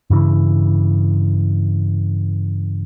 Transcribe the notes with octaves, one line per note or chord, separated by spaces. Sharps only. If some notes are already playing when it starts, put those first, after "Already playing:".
G2 C#3 E3